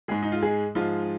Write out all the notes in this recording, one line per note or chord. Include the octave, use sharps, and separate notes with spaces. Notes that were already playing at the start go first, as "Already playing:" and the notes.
G#2 G#3 G#4
D#4
F4
G#3 G#4
G#2 F3 G#3 F4